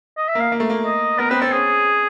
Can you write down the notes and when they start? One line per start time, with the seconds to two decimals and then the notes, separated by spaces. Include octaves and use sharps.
0.17 D#5
0.29 E5
0.35 A#3
0.40 F5
0.52 A#3
0.60 A3
0.70 A#3
0.85 D#5
1.19 B3 A#4
1.30 C4 B4
1.41 C4 A4
1.53 C#4 G#4